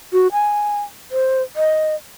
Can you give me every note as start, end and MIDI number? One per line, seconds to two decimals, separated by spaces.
0.13 0.27 66
0.32 0.82 80
1.11 1.42 72
1.56 1.95 75